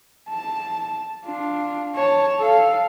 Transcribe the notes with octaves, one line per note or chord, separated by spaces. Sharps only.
A5
D4 F4
C#5 A5
A4 F5